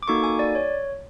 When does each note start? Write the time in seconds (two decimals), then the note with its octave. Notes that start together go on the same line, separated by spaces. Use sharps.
0.03 D6
0.08 A#3 D#4 F#4 A4 C#6
0.24 G#5
0.39 D5
0.55 C#5